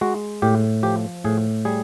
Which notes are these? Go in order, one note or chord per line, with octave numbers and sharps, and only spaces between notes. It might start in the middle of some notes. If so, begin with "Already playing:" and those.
G#3 F#4
A2 G4
F3 G4
A2 G#4
G3 G#4